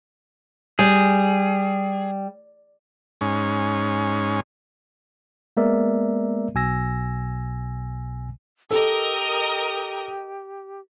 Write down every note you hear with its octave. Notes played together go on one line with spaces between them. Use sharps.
G3 G#4
G#2 C#4
G#3 A#3 B3 A#4 D5 E5
B1 B2 G#5 E6 A#6
G4 A4 A#4 D#5